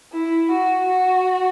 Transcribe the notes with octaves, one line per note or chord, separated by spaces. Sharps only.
E4
F#4
F#4